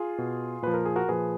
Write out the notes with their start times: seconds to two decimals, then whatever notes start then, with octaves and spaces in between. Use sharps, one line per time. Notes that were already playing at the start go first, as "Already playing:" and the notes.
Already playing: F4 G#4
0.18 B2
0.62 A#2 F3 B4
0.74 A#4
0.85 G#4
0.96 F#4 A#4
1.09 A#2 F3 G#4 B4